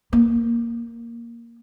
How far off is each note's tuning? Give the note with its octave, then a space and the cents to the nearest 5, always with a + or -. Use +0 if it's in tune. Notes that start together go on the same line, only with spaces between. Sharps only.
A#3 +0